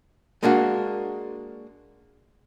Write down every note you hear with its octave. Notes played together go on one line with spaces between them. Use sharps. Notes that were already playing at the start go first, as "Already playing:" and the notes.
G#3 A#3 D4 F#4